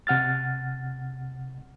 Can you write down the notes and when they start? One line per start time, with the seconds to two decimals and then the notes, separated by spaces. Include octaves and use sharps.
0.07 C3 F#5 F6 A6